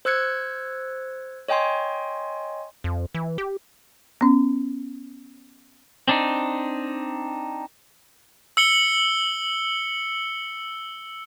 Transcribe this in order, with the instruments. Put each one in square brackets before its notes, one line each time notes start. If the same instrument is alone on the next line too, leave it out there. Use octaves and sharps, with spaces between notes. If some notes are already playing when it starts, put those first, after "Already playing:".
[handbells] C5 E6 F#6 G#6 C#7
C#5 D#5 G5 G#5 C6
[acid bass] F2
E3
G4
[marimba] B3 C#4
[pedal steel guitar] C4 D4 D#4
[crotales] E6 C#7 G7